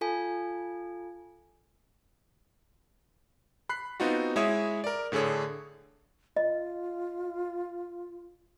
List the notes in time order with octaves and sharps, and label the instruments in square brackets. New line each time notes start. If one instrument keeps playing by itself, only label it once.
[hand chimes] F4 A4 G#5
[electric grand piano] B5 F#6 C7
B3 C4 D#4 F4 F#4
G#3 E4 C#5 E5 D#6
A#4 D5
A2 D3 G#4 A4 C#5
[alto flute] F4 [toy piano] D#5